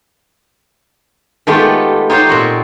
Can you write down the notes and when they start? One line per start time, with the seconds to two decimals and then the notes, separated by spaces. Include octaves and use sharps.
1.47 D#3 G#3 A3 B3 F4 G4
2.10 D#4 F4 G4 C5 C#5 F5
2.29 A#2 C4 F#4